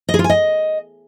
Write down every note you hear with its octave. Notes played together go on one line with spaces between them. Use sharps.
D#5
G#4
F4
G#5
D#5